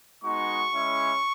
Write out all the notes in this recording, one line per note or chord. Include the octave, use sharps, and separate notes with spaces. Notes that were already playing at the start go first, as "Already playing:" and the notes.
G#3 B3 D#4 F#4 C#6
G#3 C#4 E4